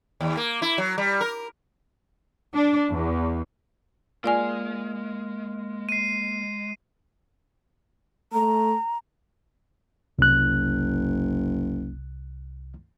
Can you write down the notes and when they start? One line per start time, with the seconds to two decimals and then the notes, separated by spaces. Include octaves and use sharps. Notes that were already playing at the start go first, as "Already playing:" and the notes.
0.21 D#2
0.37 A#3
0.62 E4
0.78 F#3
0.98 G3
1.21 A#4
2.54 D4
2.90 E2
4.24 G#3 A#3 F4 D5 G#5 F6
5.89 C7 D#7
8.33 A3 A#5
10.19 F#1 C2 F#6